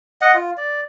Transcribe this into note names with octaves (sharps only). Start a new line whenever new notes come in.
D#5 F#5
F4
D5